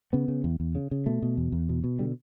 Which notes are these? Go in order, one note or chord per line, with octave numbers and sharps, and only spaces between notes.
C#3 B3
C#3
E2
E2
C#3
C#3
B2 A3
B2
E2
E2
B2
B2
D3 G3